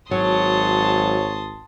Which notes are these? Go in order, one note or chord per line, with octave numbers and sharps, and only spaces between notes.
G#1 F#3 C#5 A5 C6 D#6